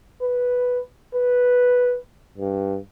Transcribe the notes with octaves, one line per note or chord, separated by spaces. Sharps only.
B4
B4
G2